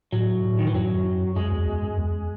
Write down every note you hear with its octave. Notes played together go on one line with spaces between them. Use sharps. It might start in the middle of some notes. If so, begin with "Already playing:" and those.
A2 F#3
A2
D#3
E3
F#2 F#3
F#2 G#3
E2
E2
F#2
E2